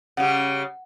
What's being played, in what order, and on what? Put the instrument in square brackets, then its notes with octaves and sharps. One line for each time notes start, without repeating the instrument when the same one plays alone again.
[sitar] C#3 G3 [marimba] F#5